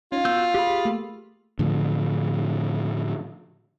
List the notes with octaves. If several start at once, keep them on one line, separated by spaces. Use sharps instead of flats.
C#4 D#4 F4
B3 F#4 E6 G6
G4 G#4 B5
A3 A#3
A2 D3 F3